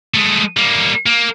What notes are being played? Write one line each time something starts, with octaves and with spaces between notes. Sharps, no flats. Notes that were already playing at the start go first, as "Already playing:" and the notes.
G#3 A3
G3 A#3
A#3